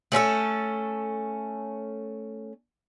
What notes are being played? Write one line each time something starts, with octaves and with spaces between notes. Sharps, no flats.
A3 C#4 F4 A4